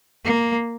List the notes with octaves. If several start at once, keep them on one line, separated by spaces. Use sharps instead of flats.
A#3